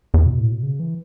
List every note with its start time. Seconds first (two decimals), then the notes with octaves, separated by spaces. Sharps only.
0.14 E2
0.26 B2
0.39 A2
0.51 B2
0.63 C#3
0.80 E3